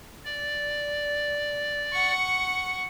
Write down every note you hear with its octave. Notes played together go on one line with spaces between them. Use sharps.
D5
F#5 C#6